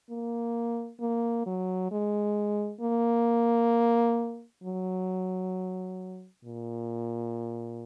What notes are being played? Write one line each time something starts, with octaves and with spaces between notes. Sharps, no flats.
A#3
A#3
F#3
G#3
A#3
F#3
A#2